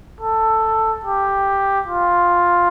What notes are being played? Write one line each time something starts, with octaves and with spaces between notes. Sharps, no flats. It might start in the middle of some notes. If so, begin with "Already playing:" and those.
A4
G4
F4